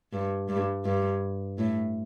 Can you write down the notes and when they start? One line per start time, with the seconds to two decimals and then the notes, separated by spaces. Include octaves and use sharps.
0.13 G2
0.49 G2
0.85 G2
1.58 A2